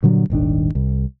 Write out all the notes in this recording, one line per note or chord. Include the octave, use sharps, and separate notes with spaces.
G2 A#2 D3 F#3
D#1 G#1 D#3 D4
C2